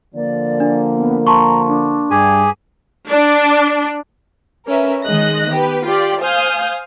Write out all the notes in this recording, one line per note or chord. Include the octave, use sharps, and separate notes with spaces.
D3 F3 A#3 D5
D4
B3
A5 A#5 C6 C#6
D4
G2 G4 G#4 G#5
D4
C#4 A#4 B4 E5
D#3 G#3 D#5 F#6 A#6
B3 G4 B4
F4 G4 D5
C5 F5 G#5 D#6 G6